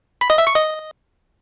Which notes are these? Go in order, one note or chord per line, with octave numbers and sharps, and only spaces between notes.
B5
D#5
E5
C#6
D#5